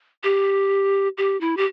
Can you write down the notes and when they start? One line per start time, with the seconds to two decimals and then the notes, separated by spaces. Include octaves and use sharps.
0.23 G4
1.18 G4
1.41 E4
1.57 G4